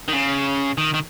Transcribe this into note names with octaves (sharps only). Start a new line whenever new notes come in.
D#3
C#3
D#3
D#3